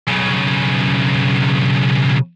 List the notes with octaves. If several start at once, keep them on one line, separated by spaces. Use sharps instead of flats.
B1 C#3